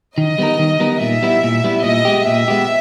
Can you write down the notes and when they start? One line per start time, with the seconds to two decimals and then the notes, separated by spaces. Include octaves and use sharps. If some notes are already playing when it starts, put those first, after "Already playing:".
0.18 D#3 D#5
0.38 G3 B3 D#4 A#4
0.59 D#3
0.80 G3 B3 D#4 A#4
1.01 A#2 E5
1.23 G3 B3 E4
1.43 A#2
1.64 G3 B3 E4
1.84 A#2 D#5
2.05 G#3 B3 G4
2.26 A#2 E5
2.48 G#3 B3 G4